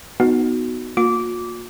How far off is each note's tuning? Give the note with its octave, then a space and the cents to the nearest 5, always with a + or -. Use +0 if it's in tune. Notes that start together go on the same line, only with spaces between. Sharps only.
B3 +0 D#4 +0 F#4 +0
A#3 +0 F4 +45 D6 -15